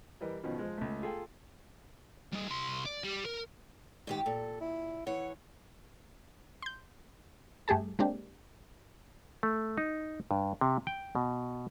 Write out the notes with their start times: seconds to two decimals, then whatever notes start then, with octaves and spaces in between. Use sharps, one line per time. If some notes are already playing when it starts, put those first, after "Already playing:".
0.21 E3 G3 A#4 D#5
0.43 B2 D#3 F3 C#4
0.58 F3 G#3
0.78 C#2 A3
1.02 F4 G#4 A4 G5
2.33 G3 D#4
2.49 C2 C6
2.85 D5
3.04 G3
3.25 A#4
4.07 G#2 D#3 G4
4.26 A#2 A4
4.61 E4
5.07 E3 C#5 F#5
6.62 C6 G6
7.68 G2 A3 G4 G#4 A5
7.99 G#3 A#3 C4 D4 G4
9.43 A3
9.78 D#4
10.31 G2
10.61 C3
10.87 G5
11.15 B2